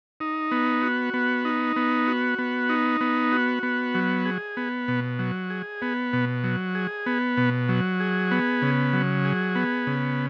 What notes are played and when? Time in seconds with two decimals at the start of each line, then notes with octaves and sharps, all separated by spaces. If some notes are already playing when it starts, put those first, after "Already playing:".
0.20 D#4
0.51 B3
0.82 F#4
1.14 B3
1.45 D#4
1.76 B3
2.08 F#4
2.39 B3
2.69 D#4
3.01 B3
3.32 F#4
3.63 B3
3.95 F#3
4.25 G#4
4.57 B3
4.88 B2
5.19 F#3
5.50 G#4
5.82 B3
6.13 B2
6.44 F#3
6.75 G#4
7.06 B3
7.37 B2
7.69 F#3
8.00 G#4
8.31 B3
8.62 C#3
8.93 F#3
9.25 G#4
9.55 B3
9.87 C#3